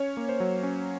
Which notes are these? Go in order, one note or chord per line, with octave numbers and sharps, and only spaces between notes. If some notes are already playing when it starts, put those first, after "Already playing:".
Already playing: C#4 C#5
A#3
C5
F#3
C#4